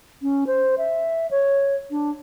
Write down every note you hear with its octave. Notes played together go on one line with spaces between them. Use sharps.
C#4
C5
E5
C#5
D4